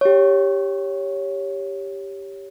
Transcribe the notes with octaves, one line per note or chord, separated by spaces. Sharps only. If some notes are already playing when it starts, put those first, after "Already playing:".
G4 C#5